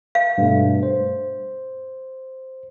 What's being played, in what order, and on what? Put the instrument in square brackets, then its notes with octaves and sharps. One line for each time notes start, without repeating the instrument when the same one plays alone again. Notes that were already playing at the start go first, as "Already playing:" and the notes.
[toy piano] F5
[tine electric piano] G2 B2 A3
C5